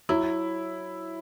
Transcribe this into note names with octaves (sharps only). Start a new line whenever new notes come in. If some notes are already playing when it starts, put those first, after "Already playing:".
F#3 E4